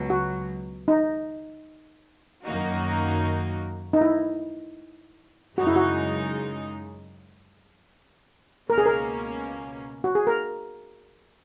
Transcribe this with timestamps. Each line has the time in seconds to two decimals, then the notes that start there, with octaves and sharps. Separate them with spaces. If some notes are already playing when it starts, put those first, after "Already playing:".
Already playing: C#2 B2 F#3
0.10 F#4
0.88 D#4
2.45 F#2 D#3 A#3 D#4 F#4
3.93 D#4
4.01 E4
5.58 F#2 C#3 G#3 D#4 F#4
5.67 E4
5.76 F#4
8.70 C#2 B2 A#3 C#4 A#4
8.78 G#4
8.86 A#4
10.04 F#4
10.15 G#4
10.27 A#4